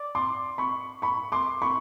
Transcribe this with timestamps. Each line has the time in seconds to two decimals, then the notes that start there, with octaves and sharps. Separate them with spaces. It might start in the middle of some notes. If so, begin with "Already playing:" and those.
Already playing: D5
0.15 C6 D6
0.58 B5 C#6
1.02 B5 C#6
1.32 C6 D6
1.62 B5 C#6